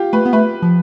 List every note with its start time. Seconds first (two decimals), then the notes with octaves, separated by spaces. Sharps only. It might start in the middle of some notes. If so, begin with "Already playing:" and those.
Already playing: F4 G4
0.13 A3 B4
0.25 B3
0.33 A3 B4
0.62 F3